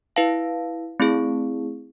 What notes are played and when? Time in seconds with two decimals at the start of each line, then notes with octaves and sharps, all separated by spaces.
0.16 E4 B4 F5 A5
1.00 A3 C4 E4 G#4